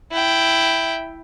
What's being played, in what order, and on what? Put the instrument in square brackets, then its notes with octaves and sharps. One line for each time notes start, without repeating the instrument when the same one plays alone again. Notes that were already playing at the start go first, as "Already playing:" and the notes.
[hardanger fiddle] E4 G5